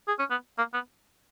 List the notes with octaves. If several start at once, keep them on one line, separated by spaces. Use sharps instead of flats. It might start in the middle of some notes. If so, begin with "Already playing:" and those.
G#4
C#4
B3
A#3
B3